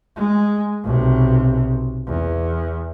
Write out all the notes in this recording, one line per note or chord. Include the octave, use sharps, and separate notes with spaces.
G#3
B1 C3
E2